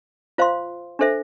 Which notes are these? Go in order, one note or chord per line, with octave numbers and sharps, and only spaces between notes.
F4 C5 F5 C6
D4 A4 C5 E5